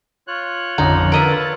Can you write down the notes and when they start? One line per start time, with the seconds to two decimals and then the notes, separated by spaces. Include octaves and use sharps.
0.28 F4 C#5 F#6
0.78 A1 F2 D3 C#4 D#4
1.12 A#4 B4 D#5 E5 E6 A6